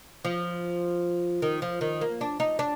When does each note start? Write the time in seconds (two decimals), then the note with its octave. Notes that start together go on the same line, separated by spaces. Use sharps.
0.25 F3
1.42 D#3
1.62 F3
1.81 D#3
2.01 A#3
2.21 D4
2.40 D#4
2.59 D4